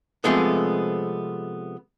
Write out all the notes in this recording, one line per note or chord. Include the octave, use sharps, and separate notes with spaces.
C3 F3 G#3 A3 B3